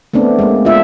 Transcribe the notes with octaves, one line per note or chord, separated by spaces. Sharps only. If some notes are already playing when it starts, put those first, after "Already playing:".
A3 B3 C4 D4
G#3 A#3
D4 F4 E5